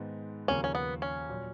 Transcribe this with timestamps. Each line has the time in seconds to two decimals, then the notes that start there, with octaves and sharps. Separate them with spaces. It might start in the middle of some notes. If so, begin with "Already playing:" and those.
Already playing: G#2 D#3 G#3 B3 D#4
0.48 D#2 C#3 F3 A#3 C#4
0.64 C#4
0.75 B3
1.02 C#4
1.30 A#2 F#3